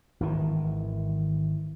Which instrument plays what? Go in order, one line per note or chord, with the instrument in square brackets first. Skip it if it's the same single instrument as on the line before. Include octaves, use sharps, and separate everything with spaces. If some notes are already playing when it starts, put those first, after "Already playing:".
[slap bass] G#1 D#3 E3